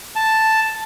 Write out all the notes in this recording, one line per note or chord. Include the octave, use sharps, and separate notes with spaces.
A5